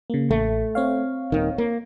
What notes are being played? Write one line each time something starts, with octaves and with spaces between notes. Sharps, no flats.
C#3 A#3
A1 A3
C4 C#5 F5
D#1 D#3
A#3